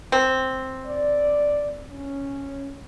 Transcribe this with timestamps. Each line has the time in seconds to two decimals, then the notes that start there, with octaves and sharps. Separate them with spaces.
0.12 C4
0.86 D5
1.91 C#4